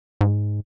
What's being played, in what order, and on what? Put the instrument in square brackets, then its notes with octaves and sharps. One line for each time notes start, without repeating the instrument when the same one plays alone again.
[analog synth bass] G#2